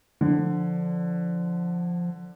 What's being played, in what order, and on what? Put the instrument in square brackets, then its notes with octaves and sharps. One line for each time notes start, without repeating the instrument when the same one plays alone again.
[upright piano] D3 [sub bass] F3